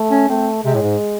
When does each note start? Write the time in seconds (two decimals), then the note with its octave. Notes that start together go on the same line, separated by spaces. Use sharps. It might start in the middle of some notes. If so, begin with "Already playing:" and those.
Already playing: A3
0.11 C#4
0.29 A3 C4
0.65 C3 G#3
0.75 A2
0.82 G#2